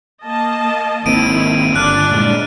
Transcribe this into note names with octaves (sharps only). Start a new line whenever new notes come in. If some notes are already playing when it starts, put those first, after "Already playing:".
A#3 D#5 A5
G#1 D#3 A#3 C4 E4 D7 D#7
G1 D4 D5 F6 F#6 D#7
A#2 G#3